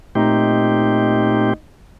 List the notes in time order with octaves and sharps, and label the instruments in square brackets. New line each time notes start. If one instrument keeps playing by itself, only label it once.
[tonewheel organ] A#2 C4 G4 [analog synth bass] A3 [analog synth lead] D#4